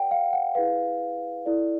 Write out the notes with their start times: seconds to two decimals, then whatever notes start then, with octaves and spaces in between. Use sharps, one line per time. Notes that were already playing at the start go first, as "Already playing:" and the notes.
Already playing: G4 B4 D5 F#5 G5
0.11 F5
0.33 F#5
0.55 E4 G#4 B4 F5
1.46 E4 A4 D5